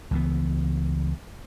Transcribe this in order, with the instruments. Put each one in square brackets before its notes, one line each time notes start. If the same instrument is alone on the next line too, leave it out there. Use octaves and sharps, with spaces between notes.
[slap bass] C#2 E3 B3